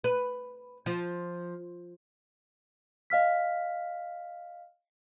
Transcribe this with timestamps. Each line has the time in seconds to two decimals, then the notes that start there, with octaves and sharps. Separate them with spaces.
0.04 B4
0.86 F3
3.10 D#5 F5 F6 B6